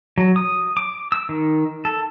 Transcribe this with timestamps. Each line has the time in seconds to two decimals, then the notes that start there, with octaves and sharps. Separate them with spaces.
0.18 F#3
0.36 D#6
0.77 D6
1.12 E6
1.29 D#3
1.85 A4